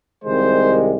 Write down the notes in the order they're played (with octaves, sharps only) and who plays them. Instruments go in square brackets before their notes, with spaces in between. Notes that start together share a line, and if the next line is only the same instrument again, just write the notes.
[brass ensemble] C2 C3 D#3 G#3 C5